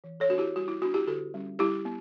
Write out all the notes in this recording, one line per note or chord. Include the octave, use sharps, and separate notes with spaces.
E3
A4 C#5
B3 D4 F#4
E4 G4
G3 F#4
E4
B3 D4 F#4
E4 G4
D3 F#4 A4
G3 C#4
G3 E4 G4
B3